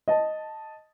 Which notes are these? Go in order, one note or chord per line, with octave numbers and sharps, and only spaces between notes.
D#5 A5